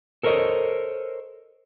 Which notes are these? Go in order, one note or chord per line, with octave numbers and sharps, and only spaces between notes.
A4 A#4 C5 C#5 D#5